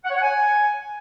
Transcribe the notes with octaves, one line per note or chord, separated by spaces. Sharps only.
F#5
C#5
F#5
G#5